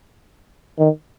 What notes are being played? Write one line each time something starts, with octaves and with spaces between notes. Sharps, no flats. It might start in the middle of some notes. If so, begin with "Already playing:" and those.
D#3